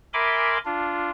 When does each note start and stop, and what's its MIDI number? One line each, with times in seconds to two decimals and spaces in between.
0.14 0.58 70
0.14 0.58 76
0.14 0.58 80
0.14 0.58 83
0.14 0.58 84
0.14 0.58 86
0.65 1.11 62
0.65 1.11 65